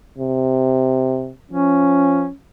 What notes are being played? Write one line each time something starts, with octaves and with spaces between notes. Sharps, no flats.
C3
F3 C#4